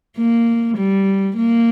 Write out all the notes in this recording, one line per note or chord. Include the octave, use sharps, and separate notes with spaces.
A#3
G3
A#3